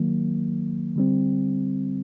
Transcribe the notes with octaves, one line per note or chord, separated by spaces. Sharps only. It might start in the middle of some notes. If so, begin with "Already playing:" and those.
Already playing: D#3 F#3 A#3
D3 G3 C4